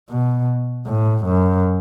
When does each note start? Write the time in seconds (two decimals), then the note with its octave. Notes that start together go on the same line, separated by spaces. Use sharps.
0.10 B2
0.87 A2
1.26 F#2